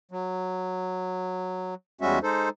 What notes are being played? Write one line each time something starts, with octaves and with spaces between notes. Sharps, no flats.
F#3
E2 G3 G#3 C#4 F#4 E5
G#3 D#4 A4 C5